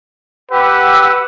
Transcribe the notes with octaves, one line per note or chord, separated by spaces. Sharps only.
G4 B4 F#5 E6